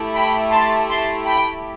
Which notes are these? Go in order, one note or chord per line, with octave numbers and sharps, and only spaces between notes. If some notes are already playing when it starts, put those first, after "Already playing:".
Already playing: A3 E4 G4
G5 B5
A5 C6
A5 C6
G5 B5